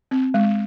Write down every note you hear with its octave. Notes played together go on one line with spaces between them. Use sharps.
C4
G#3